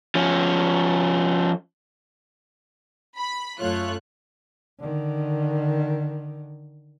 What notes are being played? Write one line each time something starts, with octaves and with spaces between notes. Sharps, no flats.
F3 C#4
B5
F#2 A3 F4 C#5 F#6
D3 D#3